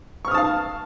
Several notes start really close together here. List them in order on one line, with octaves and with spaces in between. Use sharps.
C#6 F6 D#6 A5 F5